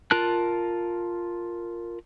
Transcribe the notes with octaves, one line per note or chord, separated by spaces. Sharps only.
F4 A#4 A5 F#6